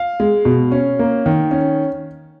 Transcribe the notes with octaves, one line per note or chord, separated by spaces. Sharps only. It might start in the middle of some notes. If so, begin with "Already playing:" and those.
Already playing: F5
G#3
B2
C#4
A#3
D#3
C#4